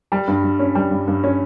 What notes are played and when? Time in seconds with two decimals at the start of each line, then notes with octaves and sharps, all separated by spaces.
0.12 G3
0.28 G2
0.43 G2
0.59 C#4
0.75 G3
0.91 G2
1.07 G2
1.24 C#4